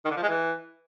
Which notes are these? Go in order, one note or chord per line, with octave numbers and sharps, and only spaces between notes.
D#3
D3
F3
G#3
E3